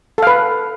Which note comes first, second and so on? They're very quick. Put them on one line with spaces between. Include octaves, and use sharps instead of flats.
A4 F5 B4